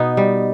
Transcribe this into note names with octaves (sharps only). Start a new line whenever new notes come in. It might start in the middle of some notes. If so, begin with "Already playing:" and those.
Already playing: B2 B3 D#4
G3